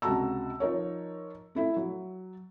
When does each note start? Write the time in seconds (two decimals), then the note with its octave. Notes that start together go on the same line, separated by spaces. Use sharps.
0.02 C#2 C3 F#4 A5 A#5 E6
0.60 F3 D#4 A#4 C#5
1.55 A3 E4 E5
1.77 F#3